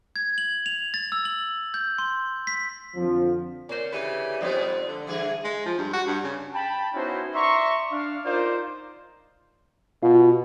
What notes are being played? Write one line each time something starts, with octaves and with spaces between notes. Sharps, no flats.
G#6
F#7
F7
A6
E6
F#7
G6
C6
B6
F2 D3 F3
D3 A#3 C#4 C5 D5
C#3 E3 G4 B4
G#2 F3 G3 B3 C4 D#4
D3
G2 E3 G#4
G#3
F3
G2
F#4
G2
C#3
G5 A5 B5
B3 C#4 D#4 E4 F#4 C5
D5 E5 A#5 C6 C#6
D4 F5
D#4 F4 A#4 C5 D5
B2 F4